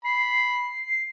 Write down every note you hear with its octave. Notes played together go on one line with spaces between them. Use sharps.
B5 C7